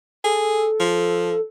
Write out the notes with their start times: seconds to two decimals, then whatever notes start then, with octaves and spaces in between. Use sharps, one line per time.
0.24 G#4 A4
0.80 F3